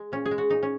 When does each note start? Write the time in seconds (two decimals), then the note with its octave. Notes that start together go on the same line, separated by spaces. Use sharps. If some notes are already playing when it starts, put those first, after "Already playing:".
Already playing: G#3
0.12 A#2 C#4
0.26 G#4
0.31 G#3
0.38 F#4
0.50 A#2 D#4
0.63 C#4